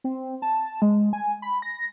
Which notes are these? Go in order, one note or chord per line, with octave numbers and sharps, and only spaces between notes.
C4
A5
G#3
G#5
B5
A#6